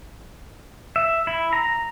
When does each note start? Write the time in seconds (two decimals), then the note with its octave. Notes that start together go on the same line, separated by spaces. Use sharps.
0.96 E5
1.27 E4
1.53 A#5